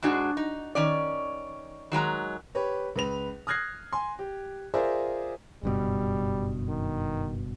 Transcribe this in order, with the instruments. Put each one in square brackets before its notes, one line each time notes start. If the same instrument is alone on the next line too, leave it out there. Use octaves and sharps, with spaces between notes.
[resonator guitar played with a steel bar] G#2 G#3 D4 F#4
D#4
D#3 C#4 D5
D#3 F#3 G#3 A#5
[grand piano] G4 B4 C#5
C#2 B4 F7
D#6 F6 F#6 G#6 A#6 C7
G#5 C6
G4
F4 G#4 A#4 C5 D5 E5
[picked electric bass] F#1 G2 B2 [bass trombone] G3
[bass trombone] D#3